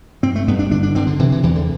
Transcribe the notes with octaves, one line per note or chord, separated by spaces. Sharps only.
G2 C4
A3
G2 B3
D4
D3 D4
D4
D3 C4
D3
C3 E3
E3
E2 E3
D3